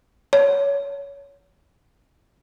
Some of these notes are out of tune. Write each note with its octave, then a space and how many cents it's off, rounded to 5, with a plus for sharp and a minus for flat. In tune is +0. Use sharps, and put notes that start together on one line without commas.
C#5 +20